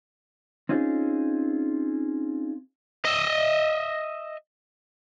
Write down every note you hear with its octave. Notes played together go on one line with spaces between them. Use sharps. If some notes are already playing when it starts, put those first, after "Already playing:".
C4 C#4 D#4 F4 G#4
D#5 E5